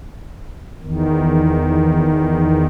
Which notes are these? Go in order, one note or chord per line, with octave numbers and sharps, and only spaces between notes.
E2 D#3